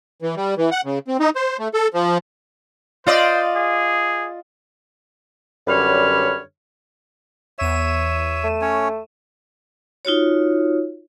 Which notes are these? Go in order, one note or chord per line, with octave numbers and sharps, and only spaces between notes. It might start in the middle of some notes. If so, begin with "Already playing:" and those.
E3
G3
E3
F#5
C#3
C4
D#4
C5
A3
A4
F3
F4 C5 D5 D#5
G#4
F#2 D3 G3 B4 C#5 F6
E2 C#5 E5 D#7 E7
A3
C#4 C#5
D#4 F4 F#4 C#5